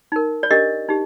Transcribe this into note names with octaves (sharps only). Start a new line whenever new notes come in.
D#4 A#4
D5
D4 G4 A#4 D#5
D#4 G4